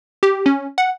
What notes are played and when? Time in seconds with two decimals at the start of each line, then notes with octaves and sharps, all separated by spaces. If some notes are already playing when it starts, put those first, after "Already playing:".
0.23 G4
0.46 C#4
0.78 F#5